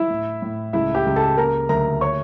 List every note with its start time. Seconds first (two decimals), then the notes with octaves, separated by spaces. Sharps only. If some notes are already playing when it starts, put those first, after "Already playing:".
Already playing: E4 E5
0.10 A2
0.42 A2
0.73 C#2 E4 E5
0.95 G4 G5
1.06 C#2
1.16 A4 A5
1.37 A#3 A#4 A#5
1.69 D2 A#4 A#5
2.01 C#5 C#6